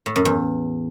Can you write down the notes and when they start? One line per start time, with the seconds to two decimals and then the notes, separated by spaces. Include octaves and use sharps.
0.06 A2
0.16 F#2
0.25 E2